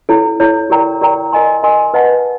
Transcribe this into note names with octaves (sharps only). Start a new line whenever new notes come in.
E4 A4 C#5
E4 A4 C#5
G4 A#4 D5 G5 A#5
G4 A#4 D5 G5 A#5
A#4 D#5 G#5 C6
A#4 D#5 G#5 C6
B4 D#5 F#5 A5